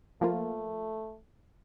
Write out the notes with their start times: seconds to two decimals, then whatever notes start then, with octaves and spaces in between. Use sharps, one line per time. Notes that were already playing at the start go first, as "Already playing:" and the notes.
0.21 F3 A3 A#3 F4